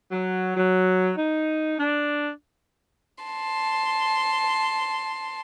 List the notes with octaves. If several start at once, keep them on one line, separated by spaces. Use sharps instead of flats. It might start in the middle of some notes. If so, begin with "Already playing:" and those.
F#3
F#3
D#4
D4
A5 C6